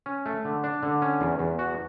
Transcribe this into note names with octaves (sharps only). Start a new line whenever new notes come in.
C#4
A3
D3
D4
D3
C#4
E2
E2
F#4